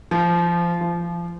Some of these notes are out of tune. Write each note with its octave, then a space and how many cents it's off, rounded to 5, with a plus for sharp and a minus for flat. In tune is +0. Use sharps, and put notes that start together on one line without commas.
F3 -20
F3 -25